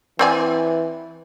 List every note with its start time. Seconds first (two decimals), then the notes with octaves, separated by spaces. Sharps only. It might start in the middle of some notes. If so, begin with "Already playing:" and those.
0.19 E3 C4 D5 G#5